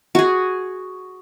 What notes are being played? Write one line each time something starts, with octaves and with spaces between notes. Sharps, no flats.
F#4 G#4